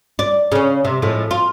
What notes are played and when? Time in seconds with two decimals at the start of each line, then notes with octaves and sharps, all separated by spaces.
0.19 D5
0.52 C#3 C#4
0.85 C3
1.02 A2 F3 G#3
1.31 F4